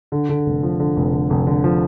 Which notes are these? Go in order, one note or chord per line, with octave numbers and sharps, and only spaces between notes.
D3
D3
F1
F3
D3
F1
D3
F1
D3
F3